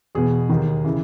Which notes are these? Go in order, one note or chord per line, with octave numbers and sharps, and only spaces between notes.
E2 B2 G#4
D#2 D#3
C#3 E3